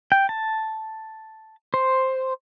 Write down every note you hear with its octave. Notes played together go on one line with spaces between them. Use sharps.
G5
A5
C5